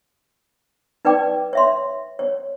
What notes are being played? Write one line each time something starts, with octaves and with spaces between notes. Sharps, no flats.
D#4 B4 D5 G5 D6
C#5 E5 C6
C#5